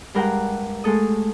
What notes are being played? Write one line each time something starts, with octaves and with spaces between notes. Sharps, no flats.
G2 G#3 A#4 F#5 G5
G#3 A3 A4 D#6